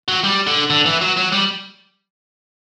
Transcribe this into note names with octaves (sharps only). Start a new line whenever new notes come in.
F#3
G3
D3
D3
E3
F#3
F#3
G3